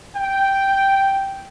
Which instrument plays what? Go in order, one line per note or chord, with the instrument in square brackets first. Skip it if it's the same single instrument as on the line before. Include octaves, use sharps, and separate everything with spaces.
[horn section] G5